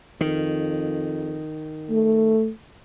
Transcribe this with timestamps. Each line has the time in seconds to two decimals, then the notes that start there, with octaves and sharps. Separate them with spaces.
0.21 F2 D#3
1.90 A3